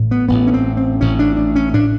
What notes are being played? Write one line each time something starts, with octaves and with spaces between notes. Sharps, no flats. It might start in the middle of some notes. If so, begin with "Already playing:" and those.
Already playing: A1 A2
B3
A1 A2 B3
C#4
C4
C4
A1 A2 C#4
D4
D4
C#4
A2 D4